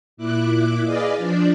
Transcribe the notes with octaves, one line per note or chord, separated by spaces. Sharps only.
A#2 E4 D6 F#6
G#4 B4 D5 D#5 F5
F3 D4 D5